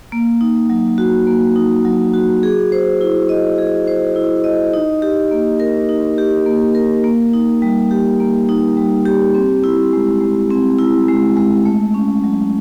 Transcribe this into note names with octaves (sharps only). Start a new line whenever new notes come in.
A#3
D#4
F#3
F#4
A#3
D#4
F#3
F#4
G#4
C5
E4
D#5
G#4
C5
E4
D#5
D#4
G4
A#3
A#4
D#4
G4
A#3
A#4
A#3
D#4
G3
G4
A#3
D#4
G3
G4
C4
E4
G#3
G#3
C4
E4
G#3
G#3
A3
C#4
F#3